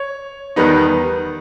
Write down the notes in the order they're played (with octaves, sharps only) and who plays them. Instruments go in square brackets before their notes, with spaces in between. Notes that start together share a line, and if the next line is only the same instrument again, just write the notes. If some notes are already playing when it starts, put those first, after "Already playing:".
Already playing: [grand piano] C#5
E2 D#3 G3 B3 D#4